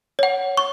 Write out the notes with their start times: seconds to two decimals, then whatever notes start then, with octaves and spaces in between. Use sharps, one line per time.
0.19 C#5 F#5
0.57 C#6